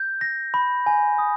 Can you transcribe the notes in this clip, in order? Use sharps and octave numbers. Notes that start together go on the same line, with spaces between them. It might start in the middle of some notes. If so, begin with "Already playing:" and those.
Already playing: G6
A#6
B5
G#5
D#6